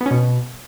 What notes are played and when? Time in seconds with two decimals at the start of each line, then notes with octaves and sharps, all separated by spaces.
0.01 B3
0.06 C#4
0.11 B2